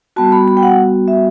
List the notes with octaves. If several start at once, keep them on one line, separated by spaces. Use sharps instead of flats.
G3 B3 F#4 A5
B5
B5
G5
F#5
E5